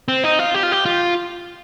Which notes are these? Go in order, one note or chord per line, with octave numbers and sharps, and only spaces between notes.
C4
D#4
F4
G4
F4
G4
F4